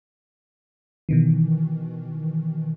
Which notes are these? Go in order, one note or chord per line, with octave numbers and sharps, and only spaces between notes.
B2 D#3 E3